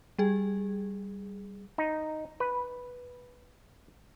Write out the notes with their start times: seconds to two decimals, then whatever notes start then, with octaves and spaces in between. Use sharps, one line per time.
0.19 G3 G#4
1.78 D#4
2.40 B4